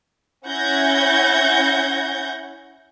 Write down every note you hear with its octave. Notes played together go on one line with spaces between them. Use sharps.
C#4 E4 F#5 G6 G#6 A#6